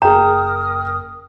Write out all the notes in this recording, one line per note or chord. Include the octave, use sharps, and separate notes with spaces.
F#1 G#4 A#4 G5 A#5 D#6 F6